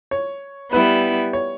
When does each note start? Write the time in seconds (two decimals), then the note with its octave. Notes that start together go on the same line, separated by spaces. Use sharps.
0.11 C#5
0.73 G3 B3 E4 B4
1.33 C#5